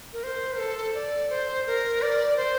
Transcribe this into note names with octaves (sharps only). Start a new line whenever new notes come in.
A#4
C5
A4
D5
C5
A#4
D5
C5